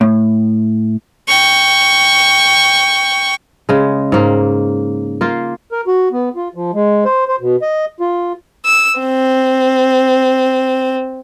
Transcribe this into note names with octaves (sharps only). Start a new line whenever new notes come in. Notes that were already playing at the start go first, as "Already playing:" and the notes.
A2
G5 C#6
C#3 G#3
G#2 A#3
A#3 F4
A#4
F#4
B3
F4
F3
G#3
C5
C5
B2
D#5
F4
E6
C4